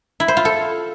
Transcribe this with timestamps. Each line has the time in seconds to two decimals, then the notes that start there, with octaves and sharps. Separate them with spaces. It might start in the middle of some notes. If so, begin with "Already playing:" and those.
0.20 E4
0.28 C5
0.37 F4
0.45 A4